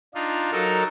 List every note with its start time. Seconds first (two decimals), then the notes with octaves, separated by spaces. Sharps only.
0.14 D4 D#4 F4
0.52 F#3 D#4 A4 A#4